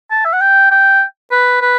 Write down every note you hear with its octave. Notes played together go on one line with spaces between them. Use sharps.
A5
E5
F#5
G5
G5
B4
B4